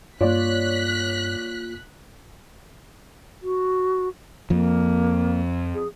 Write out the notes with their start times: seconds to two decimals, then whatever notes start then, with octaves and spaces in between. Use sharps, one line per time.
0.21 G2 A#3 F4 C#5 D5 F#6 B6
3.43 F#4
4.50 F2 F3 A#3
5.74 G#4